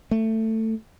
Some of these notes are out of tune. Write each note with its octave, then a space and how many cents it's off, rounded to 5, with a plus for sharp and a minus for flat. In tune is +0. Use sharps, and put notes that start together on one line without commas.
A3 +15